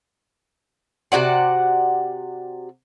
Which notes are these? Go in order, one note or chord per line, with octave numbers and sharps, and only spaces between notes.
C3 F#4 D5 F#5